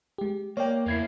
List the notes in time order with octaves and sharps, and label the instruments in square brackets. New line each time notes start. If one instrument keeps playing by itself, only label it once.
[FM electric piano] G#3 G4
[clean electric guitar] A#3 [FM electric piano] C#5 D5 G5
[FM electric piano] E2 G#6 C7 [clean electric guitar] A#3 E4